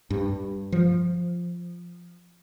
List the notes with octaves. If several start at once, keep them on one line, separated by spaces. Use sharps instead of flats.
G2
F3